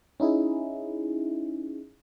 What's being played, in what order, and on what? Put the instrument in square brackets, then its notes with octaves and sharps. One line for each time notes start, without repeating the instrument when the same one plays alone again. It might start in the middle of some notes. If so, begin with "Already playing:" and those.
[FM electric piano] C#4 D#4 E4 G#4